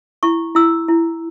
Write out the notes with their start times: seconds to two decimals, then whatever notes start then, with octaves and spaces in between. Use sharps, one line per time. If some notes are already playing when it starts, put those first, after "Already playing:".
0.23 E4 C#6
0.55 E4 E6
0.88 E4